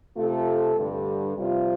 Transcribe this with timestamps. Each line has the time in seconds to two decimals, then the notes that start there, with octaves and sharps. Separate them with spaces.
0.16 C3 A3 F4 A4
0.76 G2 D3 G3
1.36 C3 G3 F4 C5